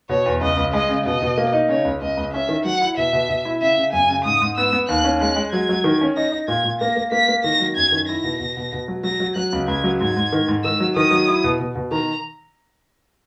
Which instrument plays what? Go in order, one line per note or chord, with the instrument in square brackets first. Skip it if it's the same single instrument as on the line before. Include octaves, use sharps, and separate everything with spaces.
[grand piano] B2 [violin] C#5
[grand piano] E2
[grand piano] C#2 [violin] D#5
[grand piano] C#2
[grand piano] G#3 [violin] D#5
[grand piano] C#3
[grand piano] B2 [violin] D#5
[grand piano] B2
A#3
D#4
[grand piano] C#3 [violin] C#5
[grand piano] C#2
[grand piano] C#2 [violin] D#5
[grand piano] C#2
[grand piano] C#4 [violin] E5
[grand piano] D#3
[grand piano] F#3 [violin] F#5
[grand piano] E4
[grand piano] B2 [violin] E5
[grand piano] B2
B2
E4
[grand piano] C#3 [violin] E5
[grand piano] C#3
[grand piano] F#2 [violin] G#5
[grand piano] C#3
[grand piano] G#2 [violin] D#6
[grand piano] G#2
[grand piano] B3 [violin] E6
[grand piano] B3
[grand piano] D#2 [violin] F#6
[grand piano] C#4
[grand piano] G#3 [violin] F#6
[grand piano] G#3
[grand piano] F#3 [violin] G#6
[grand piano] F#3
D#3
C#4
[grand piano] D#4 [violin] A#6
[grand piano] D#4
[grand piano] A#2 [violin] G#6
[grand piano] A#2
[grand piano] A#3 [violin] A#6
[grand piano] A#3
[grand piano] A#3 [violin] B6
[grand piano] A#3
[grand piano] D#3 [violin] A#6
[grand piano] F#3
[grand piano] F#2 [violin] G#6
[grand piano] D#3
[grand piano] E4 [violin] A#6
[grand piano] B2
B2
B2
B2
F#3
[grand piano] F#3 [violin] A#6
[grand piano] F#3
[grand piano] F#3 [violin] F#6
[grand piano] C#2
[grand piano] C#2 [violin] G#6
[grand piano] F#3
[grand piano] G#2 [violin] G#6
[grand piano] G#2
D#3
G#2
[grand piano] D#3 [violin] E6
[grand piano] F#3
[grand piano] D#3 [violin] D#6
[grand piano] F#3
E4
B2
B2
B2
[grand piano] D#3 [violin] A#5